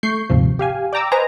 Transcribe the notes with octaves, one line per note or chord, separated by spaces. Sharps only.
A3 C#6 G6 C7
A#1 D#2 G#2 C3 F3
G4 F5 G#5
D5 G5 A#5 D6 E6
B4 C5 D#5 G#5 A#5